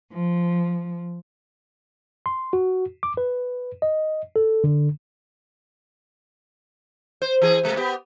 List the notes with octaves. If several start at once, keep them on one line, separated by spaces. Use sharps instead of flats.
F3
C6
F#4
D6
B4
D#5
A4
D3
C5
E3 G#4
C3 G#3 A#3
B3 G4